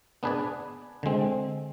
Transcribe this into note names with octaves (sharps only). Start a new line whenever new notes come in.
B3 D4 G#4 B4 D5
D3 G#3 C4